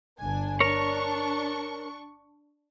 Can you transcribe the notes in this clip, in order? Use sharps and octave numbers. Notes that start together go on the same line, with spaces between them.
G1 D4 G#5
D4 A#4 C#5 C#6